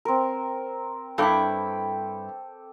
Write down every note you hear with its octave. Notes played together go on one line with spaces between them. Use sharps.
C4 A#4
G2 E4 A4 G5 D6